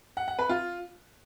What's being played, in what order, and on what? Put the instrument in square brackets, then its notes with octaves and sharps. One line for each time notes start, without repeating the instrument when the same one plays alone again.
[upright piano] F#5
F#5
B4
F4